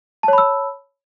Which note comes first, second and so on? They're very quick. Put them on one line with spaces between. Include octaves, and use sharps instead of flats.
A5 C#5 B5 E6